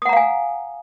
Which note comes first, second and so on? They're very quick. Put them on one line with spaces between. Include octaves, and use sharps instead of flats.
D#6 F#5 A#5 F5 G#5